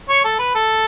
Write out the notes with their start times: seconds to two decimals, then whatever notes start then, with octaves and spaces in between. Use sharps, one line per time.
0.09 C#5
0.24 A4
0.39 B4
0.55 A4